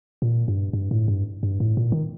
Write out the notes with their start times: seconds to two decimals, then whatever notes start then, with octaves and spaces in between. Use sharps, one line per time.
0.22 A#2
0.48 G2
0.73 G2
0.91 A2
1.08 G2
1.43 G2
1.60 A2
1.77 A#2
1.92 D#3